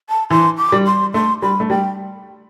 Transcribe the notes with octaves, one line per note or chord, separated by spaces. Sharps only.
A5
E3 C6
D6
G3
C6
A3 C6
G3 B5
A3
G3 G5